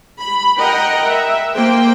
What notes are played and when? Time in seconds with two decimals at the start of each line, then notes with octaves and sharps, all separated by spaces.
0.20 B5
0.58 A#4 D#5 F#5 G5 A#5
1.05 E5
1.54 A#3 C5 G5